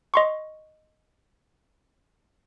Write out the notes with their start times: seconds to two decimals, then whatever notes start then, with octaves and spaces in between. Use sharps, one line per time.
0.14 D#5 C6 C#6